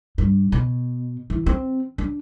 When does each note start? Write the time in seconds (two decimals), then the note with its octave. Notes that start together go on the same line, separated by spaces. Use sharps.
0.18 G2
0.52 B2
1.30 E3
1.46 C4
1.98 D4